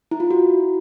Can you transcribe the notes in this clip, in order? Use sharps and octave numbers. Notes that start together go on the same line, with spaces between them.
E4
F4
F#4